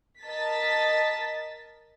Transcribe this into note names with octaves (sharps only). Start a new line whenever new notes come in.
A#4 D#5 A5 A6 B6